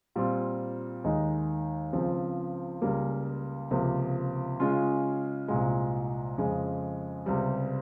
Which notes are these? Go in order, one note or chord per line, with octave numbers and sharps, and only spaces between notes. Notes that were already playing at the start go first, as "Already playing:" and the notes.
A#2 G3 C4 F4
D#2 D#3 G#3 D#4
C#2 C#3 F3 C4
C#2 C#3 G3 A#3
C#2 C3 F3 A#3
C#3 G#3 C#4 F4
C2 A#2 G#3
F2 C#3 G#3
C#2 C3 G3